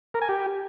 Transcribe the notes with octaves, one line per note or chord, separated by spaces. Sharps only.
A#4
G#5
G4